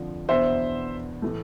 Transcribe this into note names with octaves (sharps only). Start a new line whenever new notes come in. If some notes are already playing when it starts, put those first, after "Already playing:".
Already playing: F2 D3 F3
E2 B2 B3 D4 C5 E5
A2 E3 A3